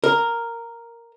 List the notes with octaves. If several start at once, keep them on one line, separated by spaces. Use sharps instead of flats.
A#4